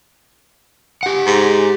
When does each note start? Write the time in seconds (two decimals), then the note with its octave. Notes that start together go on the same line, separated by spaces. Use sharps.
1.03 G4 F#5
1.26 G#2